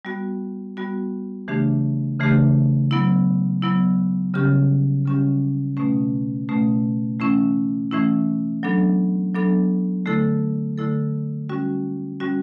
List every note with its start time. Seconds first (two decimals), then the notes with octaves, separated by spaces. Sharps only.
0.05 G3 B3 F#4
0.77 G3 B3 F#4
1.48 C#3 E3 A3 D4 G4
2.20 C#3 E3 A3 D4 G4
2.91 F#3 B3 E4
3.62 F#3 B3 E4
4.34 C#3 G3 C#4 G4
5.06 C#3 G3 C#4 G4
5.77 B2 A3 C#4
6.49 B2 A3 C#4
7.20 E3 A3 C#4 E4
7.91 E3 A3 C#4 E4
8.63 F#3 B3 D4 A4
9.35 F#3 B3 D4 A4
10.06 D3 A3 E4 A4
10.78 D3 A3 E4 A4
11.49 G3 C#4 F#4
12.20 G3 C#4 F#4